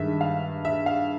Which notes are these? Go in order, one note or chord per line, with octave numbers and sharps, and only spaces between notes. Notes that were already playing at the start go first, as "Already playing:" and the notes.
Already playing: G2 D#3 G#3 E5
F5
E5
F5